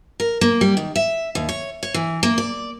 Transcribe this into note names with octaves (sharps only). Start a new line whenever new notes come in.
A#4
A#3
G3
D#3
E5
D#2
C#5
C#5
E3
A#3
D5